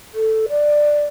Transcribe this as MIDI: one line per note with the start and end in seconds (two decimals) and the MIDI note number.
0.14 0.46 69
0.49 1.05 74